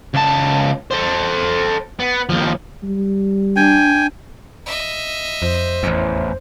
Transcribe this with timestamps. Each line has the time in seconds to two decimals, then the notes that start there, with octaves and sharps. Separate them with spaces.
0.14 C#2 A5
0.91 A4 C5
1.99 B3
2.29 D#2 F3
2.83 G3
3.56 D4 G5 G#5
4.66 D#5 E5
5.42 F2 C5
5.83 A1 E2